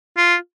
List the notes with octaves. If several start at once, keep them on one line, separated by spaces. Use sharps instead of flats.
F4